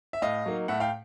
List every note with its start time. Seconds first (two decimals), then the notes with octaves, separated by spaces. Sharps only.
0.13 E5
0.22 A2 D#5 F5
0.46 F#3 A#3 D#4
0.68 A2 E5 F#5
0.80 F5 G5